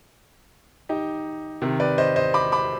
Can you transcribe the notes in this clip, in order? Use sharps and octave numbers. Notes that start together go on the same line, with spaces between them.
D#4 G4
C3 D#3
B4 D5
C5 D#5
C5 D#5
B5 D6
B5 D6